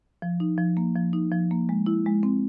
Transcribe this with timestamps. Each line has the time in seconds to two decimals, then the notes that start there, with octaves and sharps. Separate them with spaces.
0.22 F3
0.40 D#4
0.58 F3
0.77 A#3
0.96 F3
1.13 D#4
1.32 F3
1.51 A#3
1.69 G#3
1.86 E4
2.06 G#3
2.23 C4